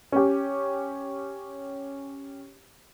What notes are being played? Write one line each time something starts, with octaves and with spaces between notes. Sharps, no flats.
C#4 G4